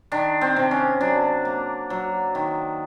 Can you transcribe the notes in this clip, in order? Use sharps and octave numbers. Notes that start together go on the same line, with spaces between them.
D#3 D4
C4
C3
C#4
F#3 D4
A#3
F#3
D#3